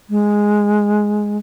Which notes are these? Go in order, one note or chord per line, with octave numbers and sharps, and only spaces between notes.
G#3